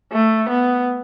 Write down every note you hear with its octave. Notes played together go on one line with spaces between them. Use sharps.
A3
B3